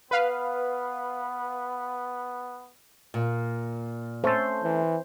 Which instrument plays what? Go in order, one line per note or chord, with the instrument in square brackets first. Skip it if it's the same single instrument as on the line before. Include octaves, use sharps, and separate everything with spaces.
[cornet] B3 [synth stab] B4 F5
[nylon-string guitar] A#2
[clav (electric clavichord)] A3 C#4 A4 [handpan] C5
[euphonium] E3